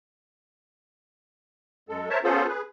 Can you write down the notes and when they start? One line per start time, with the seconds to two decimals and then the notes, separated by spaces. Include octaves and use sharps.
1.89 F#2 G#3 A4
2.10 A#4 C5 C#5 E5 A5
2.24 B3 C#4 F4 G#4 A4 C5
2.48 G#4 B4